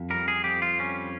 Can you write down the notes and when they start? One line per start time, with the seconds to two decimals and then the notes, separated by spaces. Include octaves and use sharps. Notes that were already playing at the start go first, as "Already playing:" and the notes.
Already playing: F2
0.10 G3 A#4
0.28 G#4
0.44 F2 G4
0.62 F4
0.79 G3 C#4